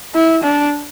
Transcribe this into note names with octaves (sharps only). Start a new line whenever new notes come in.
E4
D4